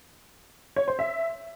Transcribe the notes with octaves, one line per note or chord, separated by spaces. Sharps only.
C#5
C5
E5